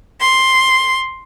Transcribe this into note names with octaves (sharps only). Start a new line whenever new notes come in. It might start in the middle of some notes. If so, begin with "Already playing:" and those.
C6